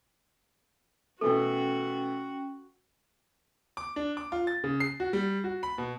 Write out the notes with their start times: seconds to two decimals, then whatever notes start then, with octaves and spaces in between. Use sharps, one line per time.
1.21 B2 E3 A3 C#4 F#4 A4 G5
3.77 D6
3.96 D4
4.17 D6
4.32 F4
4.47 A6
4.64 C#3
4.80 C7
5.00 F#4
5.13 G3
5.44 F#4
5.63 B5
5.78 B2